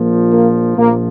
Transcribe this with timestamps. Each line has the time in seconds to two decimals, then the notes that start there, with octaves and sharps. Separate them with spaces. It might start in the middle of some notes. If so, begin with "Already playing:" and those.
Already playing: A#1 A#2 F3
0.32 A#3
0.77 A#1 A#2 F3 A#3